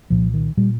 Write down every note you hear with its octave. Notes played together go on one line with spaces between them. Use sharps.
C2 A#2 F3
D#3
A#2 G3